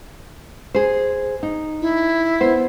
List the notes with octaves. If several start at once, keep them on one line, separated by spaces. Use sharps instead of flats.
G#4 C5
D#4
E4
B3 C5